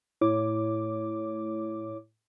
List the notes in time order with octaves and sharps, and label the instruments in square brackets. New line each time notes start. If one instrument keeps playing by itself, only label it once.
[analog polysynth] A2 [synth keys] E4 C#5 D6